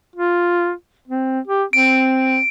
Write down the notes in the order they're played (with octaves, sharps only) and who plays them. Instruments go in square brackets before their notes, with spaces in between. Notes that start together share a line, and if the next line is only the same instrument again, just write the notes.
[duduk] F4
C4
G4
[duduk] C4 [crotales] D7